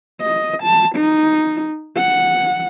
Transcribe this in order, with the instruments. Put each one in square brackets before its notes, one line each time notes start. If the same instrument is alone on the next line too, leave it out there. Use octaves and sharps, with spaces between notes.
[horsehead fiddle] D#5
A5
D#4
F#5